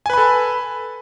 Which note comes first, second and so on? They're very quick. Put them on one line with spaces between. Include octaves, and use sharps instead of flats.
G#5 B4 B5 A4